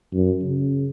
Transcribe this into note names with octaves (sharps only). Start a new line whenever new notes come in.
F#2
C#3